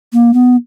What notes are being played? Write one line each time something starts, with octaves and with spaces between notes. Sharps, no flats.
A#3
B3